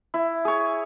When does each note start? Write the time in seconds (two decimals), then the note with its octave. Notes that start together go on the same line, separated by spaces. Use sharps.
0.14 E4
0.45 G#4 C#5